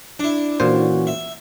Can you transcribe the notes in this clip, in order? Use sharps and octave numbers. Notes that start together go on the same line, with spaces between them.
D4 E4
A#2 E3 C#4 F#4 C5
E5